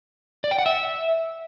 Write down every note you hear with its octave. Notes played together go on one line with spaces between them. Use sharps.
D5
G5
F#5
E5